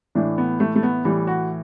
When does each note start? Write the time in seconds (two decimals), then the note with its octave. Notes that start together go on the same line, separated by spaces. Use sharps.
0.15 A2 E3 D4
0.38 B3
0.60 A3
0.76 A3
0.83 B3
1.05 A2 E3 G3
1.27 F#4